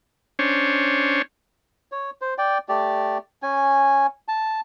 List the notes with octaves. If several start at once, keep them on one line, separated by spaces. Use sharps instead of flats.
C#4 D4 C5 C#5
C#5
C5
D5 G5
A3 G4 D5
C#4 G#5
A5